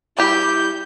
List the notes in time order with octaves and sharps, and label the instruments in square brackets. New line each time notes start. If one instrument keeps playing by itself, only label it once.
[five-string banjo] G3 G4 [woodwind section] E4 [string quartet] G6